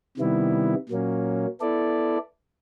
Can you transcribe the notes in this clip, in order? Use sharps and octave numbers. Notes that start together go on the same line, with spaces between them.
C3 D#3 G3 B3 E4
A#2 F#3 A#3 C#4
B3 E4 A4 D5